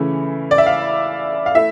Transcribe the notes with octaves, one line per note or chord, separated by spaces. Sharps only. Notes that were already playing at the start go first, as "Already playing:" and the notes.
Already playing: C#3 E3 A3 C#4 E4
D5
E5
F5
F5
A3 E4 E5